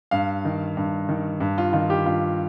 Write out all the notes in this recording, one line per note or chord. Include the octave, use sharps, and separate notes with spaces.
G2 F5
D#3
G2
D#3
G2
F4
D#3 F4
G4
G2 F4